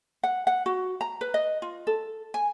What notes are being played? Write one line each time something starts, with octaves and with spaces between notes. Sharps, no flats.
F#5
F#5
F#4
A#5
B4
D#5
F4
A4
G#5